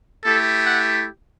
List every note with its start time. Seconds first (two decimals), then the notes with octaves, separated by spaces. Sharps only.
0.24 A3 E4 G4 A4
0.66 F#5